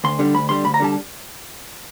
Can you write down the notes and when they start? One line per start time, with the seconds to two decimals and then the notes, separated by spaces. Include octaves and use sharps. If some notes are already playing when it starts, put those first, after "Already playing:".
0.04 D2 C6
0.19 D3 G3
0.34 D2 B5
0.49 D3 G3 C6
0.64 D2 B5
0.74 A#5
0.80 D3 G3 A5